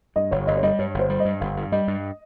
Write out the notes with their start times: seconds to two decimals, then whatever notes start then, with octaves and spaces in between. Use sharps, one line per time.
0.16 G2 D#5
0.31 G1 C#5
0.47 G1 D#5
0.57 C#5
0.63 G3 D#5
0.79 G2 C#5
0.94 G1 C5
1.10 G3
1.20 D#5
1.25 G2
1.40 G1 F5
1.57 G2
1.72 G3 D#5
1.88 G2